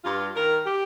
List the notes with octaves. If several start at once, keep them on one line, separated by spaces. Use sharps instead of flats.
G2 F4
D#3 A#4
G4